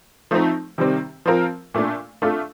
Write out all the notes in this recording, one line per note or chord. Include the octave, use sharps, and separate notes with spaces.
F3 A3 C4 D#4
C3 D#3 G3 C4
F3 C4 F4 A#4
A#2 A3 D4
A3 D4 F4 A4